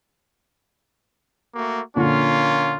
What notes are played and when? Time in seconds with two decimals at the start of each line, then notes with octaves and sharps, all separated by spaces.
1.54 A3 A#3 F#4
1.96 A#2 D3 F3 A#3 C#4 F4